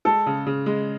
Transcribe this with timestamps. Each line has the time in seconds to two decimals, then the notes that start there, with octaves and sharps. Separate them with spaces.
0.05 G#3 A4
0.26 C#3
0.46 C#3
0.66 G#3